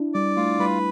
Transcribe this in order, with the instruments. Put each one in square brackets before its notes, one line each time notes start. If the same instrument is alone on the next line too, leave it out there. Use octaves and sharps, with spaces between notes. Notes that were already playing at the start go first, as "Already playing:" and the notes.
Already playing: [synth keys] D4 E4
[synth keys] G3 [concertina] D5
[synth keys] A3 [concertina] F4
[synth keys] G3 [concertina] B4